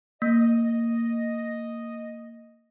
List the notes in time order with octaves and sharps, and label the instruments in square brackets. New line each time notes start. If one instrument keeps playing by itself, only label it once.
[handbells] A#3 [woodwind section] D#5